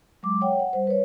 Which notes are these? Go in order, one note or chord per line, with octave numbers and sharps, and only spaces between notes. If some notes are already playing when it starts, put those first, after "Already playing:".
F#3 G#3 D6
C#5 F#5 G5
F#5
G3 C5
B4 C#5